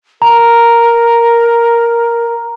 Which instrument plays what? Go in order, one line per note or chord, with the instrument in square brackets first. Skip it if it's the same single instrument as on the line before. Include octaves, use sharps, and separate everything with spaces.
[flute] A#4 [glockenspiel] A#5